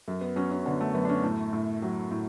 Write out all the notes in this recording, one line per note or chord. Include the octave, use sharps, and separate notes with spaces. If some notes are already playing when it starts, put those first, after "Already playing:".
F#2
B3
F#3 C#4
C#4
D3 B3
A3
F#2 B3
D4
C#4
A2 A3
A2
F#3
A2